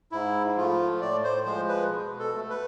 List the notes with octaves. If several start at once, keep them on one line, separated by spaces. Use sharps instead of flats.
G#2 E4
F3 A3 F4
A2 D5
C5
F3 G#3 C5
B4
B2
A4
A3
B4